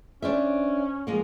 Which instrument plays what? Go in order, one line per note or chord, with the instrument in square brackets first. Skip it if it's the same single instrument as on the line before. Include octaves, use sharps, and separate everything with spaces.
[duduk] C#4 [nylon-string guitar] D4 C5 E5
[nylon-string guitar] F3 G#3 A#3